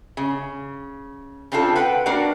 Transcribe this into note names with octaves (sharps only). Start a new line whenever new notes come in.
C#3
C#3 C4 D4 F4 A4
B4 F#5 G5
A#3 D4 F#4 A#4 D5 F#5